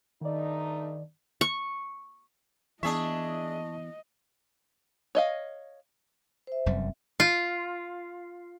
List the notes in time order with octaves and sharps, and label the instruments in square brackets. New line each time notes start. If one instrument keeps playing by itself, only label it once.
[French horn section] G2 A3 D#4 [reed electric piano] D#3 D5
[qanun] C#6
[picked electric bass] E3 B3 [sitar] D4 G#4 E5 [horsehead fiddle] D#5 [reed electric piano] A5 C#6
[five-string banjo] C#5 D#5 F5
[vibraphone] C5 E5
[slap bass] F1 F#2 G3 [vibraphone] C4 E5 F#5
[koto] F4